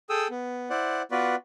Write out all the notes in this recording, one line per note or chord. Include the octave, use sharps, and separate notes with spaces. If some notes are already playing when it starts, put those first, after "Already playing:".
G#4 A4 G5 D#6 E6
B3
E4 C5 D5 F#5
B3 F4 F#4 B4 D5